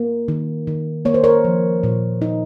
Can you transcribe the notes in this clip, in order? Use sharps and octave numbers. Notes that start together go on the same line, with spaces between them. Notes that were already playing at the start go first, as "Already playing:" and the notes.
Already playing: A#3
D#3
D#3
A#3 C#5
C5
A#4 C#5
F3
A#2
D#4